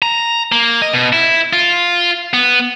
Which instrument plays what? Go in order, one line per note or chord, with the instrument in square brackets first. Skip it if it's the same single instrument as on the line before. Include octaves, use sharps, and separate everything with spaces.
[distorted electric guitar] A#5
A#3
D#5
B2
E4
F4
B3